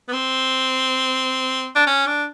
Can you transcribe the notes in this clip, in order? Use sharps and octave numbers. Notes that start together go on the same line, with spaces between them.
B3
C4
D4
C#4
D4